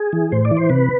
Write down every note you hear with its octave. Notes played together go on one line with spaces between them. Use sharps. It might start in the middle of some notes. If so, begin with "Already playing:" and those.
Already playing: G#4
E3
A2 C5
D5
E3
C5
C3 B4